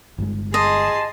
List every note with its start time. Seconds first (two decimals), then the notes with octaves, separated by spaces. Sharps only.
0.18 G1 G2 G#3
0.54 G#4 D#5 A5 C6